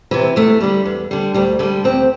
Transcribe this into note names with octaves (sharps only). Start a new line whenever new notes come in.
C3 E3 C4
E2 A3
D3 G3
E2
D3 G3
D2 G3
D3 G3 A3
D2 C4